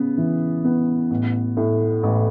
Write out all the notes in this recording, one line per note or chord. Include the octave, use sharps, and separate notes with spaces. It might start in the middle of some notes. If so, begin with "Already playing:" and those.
Already playing: C#3 B3
E3
B3
A1
A2
A1